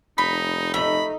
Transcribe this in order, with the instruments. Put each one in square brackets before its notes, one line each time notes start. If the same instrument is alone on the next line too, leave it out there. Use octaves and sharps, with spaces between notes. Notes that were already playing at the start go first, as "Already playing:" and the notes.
[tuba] F1 [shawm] D#4 [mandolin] B5
[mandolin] A3 [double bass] D#4 [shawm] B5